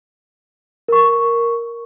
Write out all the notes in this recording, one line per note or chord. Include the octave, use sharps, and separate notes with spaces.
A#4 C#6